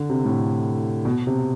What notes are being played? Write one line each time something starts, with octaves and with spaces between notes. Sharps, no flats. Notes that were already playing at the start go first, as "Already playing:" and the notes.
Already playing: D3
C3
A2
B2
C3